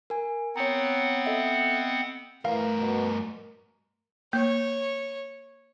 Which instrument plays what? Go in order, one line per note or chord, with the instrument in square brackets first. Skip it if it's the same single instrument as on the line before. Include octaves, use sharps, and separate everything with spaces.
[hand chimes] A#4 G#5
[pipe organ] B3 C4 F#5 [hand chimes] C#5 A#5
[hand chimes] A4 D#5 E5
[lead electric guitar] G2 A#4 [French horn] E3 [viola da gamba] A3 [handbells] F5
[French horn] B2
[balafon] A#3 [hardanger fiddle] C#5